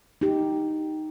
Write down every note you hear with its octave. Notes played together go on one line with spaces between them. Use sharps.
D#4 G4